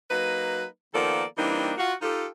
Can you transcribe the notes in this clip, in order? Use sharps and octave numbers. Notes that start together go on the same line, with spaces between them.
F#3 A#3 D#4 B4
D#3 F3 A#3 B3 A4 D5
E3 G3 A#3 C4 D4 D#4
F4 F#4
D#4 F4 G4 A4